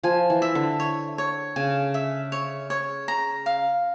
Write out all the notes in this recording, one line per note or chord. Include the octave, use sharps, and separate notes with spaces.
F3 G#5
E3
E5
D3
C#5
C#5
C#3 G#5
E5
C#5
C#5
A#5
F5